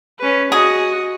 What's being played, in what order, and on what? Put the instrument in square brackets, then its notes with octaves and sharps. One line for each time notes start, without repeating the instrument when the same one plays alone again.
[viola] C#4 B4
[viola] F#4 D#5 [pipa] G#4